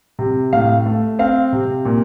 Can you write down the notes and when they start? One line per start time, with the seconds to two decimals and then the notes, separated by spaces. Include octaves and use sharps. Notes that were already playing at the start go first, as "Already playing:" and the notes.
0.19 C3
0.53 A2 F5
0.86 A3
1.19 C4 F5
1.53 C3
1.85 A#2